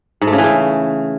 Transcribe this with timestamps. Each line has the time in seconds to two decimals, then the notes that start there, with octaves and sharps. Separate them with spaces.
0.21 G#2
0.27 A3
0.33 C#3
0.38 E3
0.44 C#3